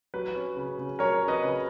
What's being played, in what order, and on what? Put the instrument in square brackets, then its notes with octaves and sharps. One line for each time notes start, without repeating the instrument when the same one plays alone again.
[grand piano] F#3 B4
C#4
C#3
C#3
F#3 A#4 C#5
C#4
B4 D#5
C#3